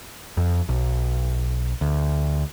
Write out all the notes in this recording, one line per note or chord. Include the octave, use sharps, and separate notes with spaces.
F2
B1
D2